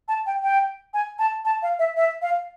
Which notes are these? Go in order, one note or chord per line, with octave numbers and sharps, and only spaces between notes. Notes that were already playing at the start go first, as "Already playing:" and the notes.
A5
G5
G5
G#5
A5
A5
F5
E5
E5
F5